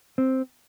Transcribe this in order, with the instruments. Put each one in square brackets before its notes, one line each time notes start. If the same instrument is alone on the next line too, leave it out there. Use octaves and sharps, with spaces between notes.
[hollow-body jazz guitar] C4